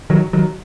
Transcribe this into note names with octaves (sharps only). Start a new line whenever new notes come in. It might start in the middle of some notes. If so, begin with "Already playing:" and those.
D#3 F#3
D#3 F#3